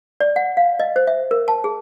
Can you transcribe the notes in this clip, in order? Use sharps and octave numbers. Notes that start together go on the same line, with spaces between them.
D5
F#5
F5
D#5
C5
E5
A#4
A5
G#4